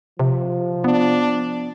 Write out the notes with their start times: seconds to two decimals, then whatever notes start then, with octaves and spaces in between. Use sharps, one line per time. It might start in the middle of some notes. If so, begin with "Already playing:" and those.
0.19 C3 F3
0.84 B3 D4